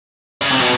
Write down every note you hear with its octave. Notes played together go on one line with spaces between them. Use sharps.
C#3
C3
B2